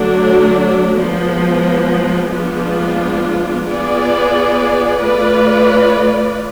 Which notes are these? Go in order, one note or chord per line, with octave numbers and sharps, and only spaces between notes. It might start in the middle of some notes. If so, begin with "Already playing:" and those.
Already playing: D3 F#3 A3 D4
F3 G#3 B3
F3 G#3 B3 D4 F4
B3 F4 G#4 D5
A3 F4 B4 D5